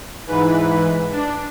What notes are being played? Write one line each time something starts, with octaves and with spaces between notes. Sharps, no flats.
G#2 E3 B4
D4